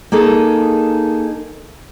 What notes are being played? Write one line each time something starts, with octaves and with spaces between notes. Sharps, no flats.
A#3 D#4 G#4 A4